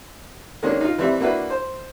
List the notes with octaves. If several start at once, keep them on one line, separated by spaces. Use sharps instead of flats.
D#3 G#3 A#3 C#4 D4
D#4 F4
E3 G3 C4 E5
A#3 D4 E4 F#4 B4
C5